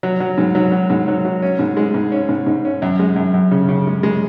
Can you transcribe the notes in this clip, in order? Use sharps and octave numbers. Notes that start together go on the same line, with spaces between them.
F#3
F#3
G#2
F#3
F#3
G#2
F#3
F#3
C#4
G#2
G#3
G#2
C#4
G#2
G#2
C#4
F#2
G#3
F#2
F#2
C#3
C#3
G#3
G#3